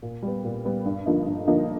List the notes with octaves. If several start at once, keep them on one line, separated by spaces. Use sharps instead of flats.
A#2
G3 B3
A#2
G3 B3
G2
D3 F3 A#3 D#4
G2
D3 F3 A#3 D#4